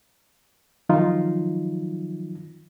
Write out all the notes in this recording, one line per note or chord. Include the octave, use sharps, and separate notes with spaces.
D#3 F3 F#3 D#4 F4